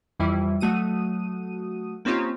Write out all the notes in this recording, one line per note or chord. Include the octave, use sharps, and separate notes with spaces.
F2 E3 G3 E4
F#3 A3 F#4 D#6 D#7
A#3 C4 C#4 D#4 F4 G4